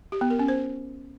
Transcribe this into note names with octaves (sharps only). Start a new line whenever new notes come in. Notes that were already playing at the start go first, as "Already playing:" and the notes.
G4
B3
A#4
C#4
C5